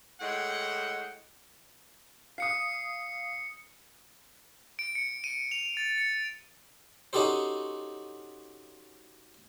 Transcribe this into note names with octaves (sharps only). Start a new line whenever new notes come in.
A2 G#3 F#5 G5
F5 D#6 C7 C#7
D7
C#7
D#7
F7
A6
C#7
C#4 D#4 F#4 G4 A4 C5